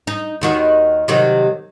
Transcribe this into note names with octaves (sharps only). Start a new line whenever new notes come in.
D#4
D#2 D#3 F#4
C3 D#3 F#3